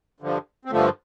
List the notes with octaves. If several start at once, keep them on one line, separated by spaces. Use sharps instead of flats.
G2 D3 F3
C4
G2 D3 F3 A3